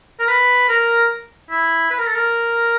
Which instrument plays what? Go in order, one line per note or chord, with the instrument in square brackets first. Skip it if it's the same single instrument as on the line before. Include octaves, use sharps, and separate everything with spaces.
[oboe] A#4
B4
A#4
E4
B4
A#4
A4
A#4